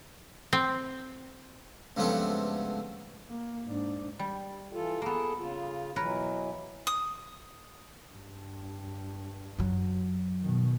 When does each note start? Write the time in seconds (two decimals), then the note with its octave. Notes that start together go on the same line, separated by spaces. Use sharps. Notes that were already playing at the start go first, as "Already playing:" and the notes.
0.53 C4
1.97 C#2 G2 F3 A3 B3 C4
3.29 A#3
3.66 G#2 D4
4.19 G3
4.73 E3 F4 A4
5.02 A#3 B3 G#4 A4 A5
5.37 C#3 F4
5.96 B2 E3 F#3 A#4 B4 C#5
6.87 D#6
8.11 G2
9.59 F#2 F#3
10.42 B2 D#3